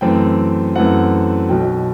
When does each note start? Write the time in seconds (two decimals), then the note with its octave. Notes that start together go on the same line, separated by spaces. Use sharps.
0.01 F#2 E3 A3 C4 G5
0.75 F#2 E3 A3 C4 F#5
1.49 B1 B2 F#3 G5